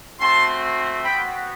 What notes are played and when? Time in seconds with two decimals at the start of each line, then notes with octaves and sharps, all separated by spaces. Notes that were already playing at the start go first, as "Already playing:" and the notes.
0.19 A3 C4 F#4 A5 C6
1.04 B3 F#4 G5 B5